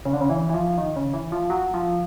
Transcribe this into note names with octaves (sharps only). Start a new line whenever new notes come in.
C#3
D3
C#3
E3
E3
F3
D#3
C#3
E3
F3
F#3
F3